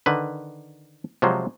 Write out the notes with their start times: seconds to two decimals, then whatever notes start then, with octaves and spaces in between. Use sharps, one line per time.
0.06 D3 D#3 B4
1.22 C3 F3 F#3 G#3 C5